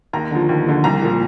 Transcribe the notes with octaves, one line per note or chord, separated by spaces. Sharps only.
D#2 A#5
D3 F3
D#2
D3 F3
C2 A#5
A#2 F3